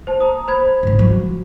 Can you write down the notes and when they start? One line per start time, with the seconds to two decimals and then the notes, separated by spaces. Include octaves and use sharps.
0.07 C5 A5
0.20 A#5 D#6
0.48 C5 B5 G#6
0.83 G#2 D#3
0.99 F3 F#3